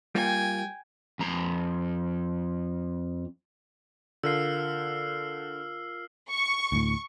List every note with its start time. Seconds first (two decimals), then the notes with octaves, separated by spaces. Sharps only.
0.15 G3 A#3 F4 G5 G#5
1.19 F2 A#5
4.23 D3 F4 A#4 F5 E6 F6 C7
6.31 C#6
6.72 D2 A2